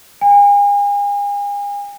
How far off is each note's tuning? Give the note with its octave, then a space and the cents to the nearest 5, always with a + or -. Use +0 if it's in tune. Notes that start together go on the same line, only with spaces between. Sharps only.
G#5 -40